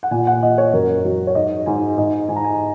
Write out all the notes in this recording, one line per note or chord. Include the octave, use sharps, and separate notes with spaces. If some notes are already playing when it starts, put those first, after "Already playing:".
F#5
A#2 G#5
F#5
A#2 D#5
C#5
F#2 A#4
F#3
C#5
G#2 D#5
G#2 G#5
G#2 D#5
G#2 G#5
A#5
G#5